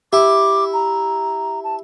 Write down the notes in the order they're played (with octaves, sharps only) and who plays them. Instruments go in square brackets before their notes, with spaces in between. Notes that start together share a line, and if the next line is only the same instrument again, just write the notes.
[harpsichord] E4 [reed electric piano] G4 [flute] D6
[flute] A#5
A5